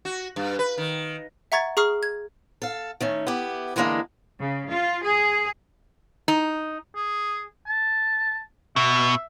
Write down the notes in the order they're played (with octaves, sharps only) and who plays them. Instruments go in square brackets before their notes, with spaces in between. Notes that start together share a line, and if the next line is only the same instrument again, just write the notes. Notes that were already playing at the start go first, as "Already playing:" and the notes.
[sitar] F#4
G2
B4
D#3
[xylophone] E5 F#5 A#5 C#6 G#6 A6
G#4 A#5 C#6 D#6 F6 C7
G#6
[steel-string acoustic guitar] A4 F5
D#3 A3 C#4
B3 E4 G4
D3 E3 G3 G#3 A#3 D4
[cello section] C#3
F4
G#4
[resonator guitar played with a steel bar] D#4
[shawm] G#4
A5
[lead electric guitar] B2 [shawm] E5